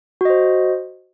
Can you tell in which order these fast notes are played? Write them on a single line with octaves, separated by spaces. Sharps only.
F#4 D#5 C5